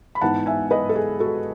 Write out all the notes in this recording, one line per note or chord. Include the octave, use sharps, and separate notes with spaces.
B5
G#2 E3 B3 D#4 F#5 A5
E5 G#5
B4 D#5
A4
G#4
F#4 A4